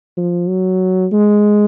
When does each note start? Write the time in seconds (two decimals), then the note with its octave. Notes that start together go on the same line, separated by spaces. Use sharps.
0.17 F3
0.48 F#3
1.12 G#3